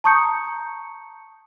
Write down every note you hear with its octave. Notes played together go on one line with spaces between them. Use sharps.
A5 A#5 C#6 D#6 G6 C#7